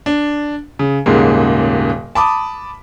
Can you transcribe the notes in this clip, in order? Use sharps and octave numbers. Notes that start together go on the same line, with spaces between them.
D4
C#3
D#1 G#2 C#3 A#3
A5 B5 D6 D#6